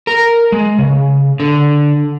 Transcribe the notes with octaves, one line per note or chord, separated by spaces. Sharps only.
A#4
G#3
C#3
D3